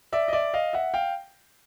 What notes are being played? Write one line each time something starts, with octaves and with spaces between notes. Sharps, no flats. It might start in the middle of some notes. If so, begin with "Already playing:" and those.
D5 E5
D#5
D5 E5
D#5 F5
E5 F#5
F5 G5